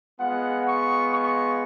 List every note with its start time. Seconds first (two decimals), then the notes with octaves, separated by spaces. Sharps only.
0.19 G#3 B3 F4 F#5
0.66 C#6
1.12 C#6